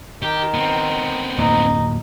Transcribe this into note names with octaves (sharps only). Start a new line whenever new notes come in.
D#3 G4
B3 C4
D1 F2 A#3 D#4